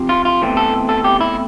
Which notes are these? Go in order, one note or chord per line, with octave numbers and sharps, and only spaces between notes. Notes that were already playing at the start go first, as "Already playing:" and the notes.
Already playing: C3 F3 C4
F4
F4
E2 E3 A3 C4
A4
A4
G4
E4